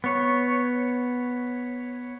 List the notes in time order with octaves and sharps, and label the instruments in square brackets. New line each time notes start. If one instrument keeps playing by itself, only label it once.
[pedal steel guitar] B3 C#5